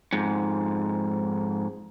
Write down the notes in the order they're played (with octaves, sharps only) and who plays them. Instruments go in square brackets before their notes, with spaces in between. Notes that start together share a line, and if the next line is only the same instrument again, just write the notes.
[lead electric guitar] F2 G#2